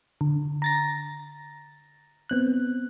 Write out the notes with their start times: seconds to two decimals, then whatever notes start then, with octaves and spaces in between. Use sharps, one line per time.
0.21 D3
0.62 A#5 A6 A#6
2.29 B3 C4 F#6